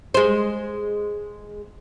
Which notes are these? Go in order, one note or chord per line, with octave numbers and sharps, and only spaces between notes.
G#3 C5